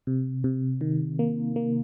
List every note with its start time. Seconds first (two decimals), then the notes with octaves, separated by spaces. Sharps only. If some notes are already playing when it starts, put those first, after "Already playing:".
0.07 C3
0.44 C3
0.81 D#3
1.19 A#3
1.56 A#3